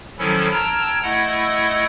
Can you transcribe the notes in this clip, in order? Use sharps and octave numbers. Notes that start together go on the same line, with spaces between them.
D#3 F3 F#3 C#4 E4 A4
G5 A5 A#5 E6 F6 G#6
A3 E4 D#5 F#5 E6 G#6